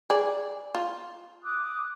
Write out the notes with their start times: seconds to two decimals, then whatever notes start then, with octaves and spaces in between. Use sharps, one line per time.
0.10 G#4 D5
0.75 F4
1.43 D6 D#6 F#6